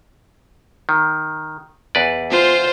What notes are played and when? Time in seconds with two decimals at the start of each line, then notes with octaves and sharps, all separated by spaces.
0.89 D#3
1.95 E2 B4 D5
2.30 F4 C5